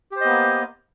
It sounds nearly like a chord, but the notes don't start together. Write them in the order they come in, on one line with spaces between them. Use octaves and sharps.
G4 C5 D#5 B3 A#3